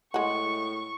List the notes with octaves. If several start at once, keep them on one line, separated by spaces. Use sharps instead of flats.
A2 G#3 F#5 C#6